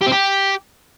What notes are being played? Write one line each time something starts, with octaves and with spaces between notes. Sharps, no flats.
G4
C4
G4